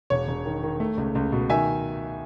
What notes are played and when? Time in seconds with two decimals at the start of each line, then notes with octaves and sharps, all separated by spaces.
0.10 E1 C#5
0.28 E1
0.46 D#3
0.63 D#3
0.80 A3
0.98 C#2
1.15 C#2
1.32 B2
1.50 D#3 E5 G#5